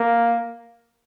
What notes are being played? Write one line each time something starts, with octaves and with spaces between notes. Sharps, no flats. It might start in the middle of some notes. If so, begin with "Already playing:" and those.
Already playing: A#3